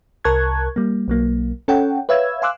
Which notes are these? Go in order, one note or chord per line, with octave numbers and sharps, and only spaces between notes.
C2 A#4 A5 C#6 F#6 G#6
G3 A#3
B1 F#3 A#3
C#4 A4 C#5 F#5 G5
B4 C#5 E5 F5 E6 G#6
F5 G#5 C6 D6 E6 F#6